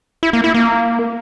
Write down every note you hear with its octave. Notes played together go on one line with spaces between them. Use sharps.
E4
A#3
E4
A#3